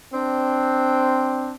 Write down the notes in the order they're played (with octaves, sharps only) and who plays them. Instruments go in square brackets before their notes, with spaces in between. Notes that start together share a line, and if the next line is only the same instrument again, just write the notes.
[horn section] C4 D4